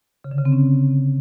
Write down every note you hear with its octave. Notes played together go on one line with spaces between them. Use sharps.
C#3
D3
C#3
C4
C#4